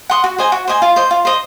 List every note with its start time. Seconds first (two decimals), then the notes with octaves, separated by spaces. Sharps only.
0.10 F#5 C6 D#6
0.24 F#4
0.38 C5 D#5 G#5
0.52 F#4
0.68 C5 D#5 G#5
0.82 F4
0.96 C5 D#5
1.11 F4
1.25 C5 D#5